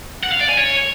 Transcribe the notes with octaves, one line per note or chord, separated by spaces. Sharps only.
F#5
F5
D5
G#5
C#5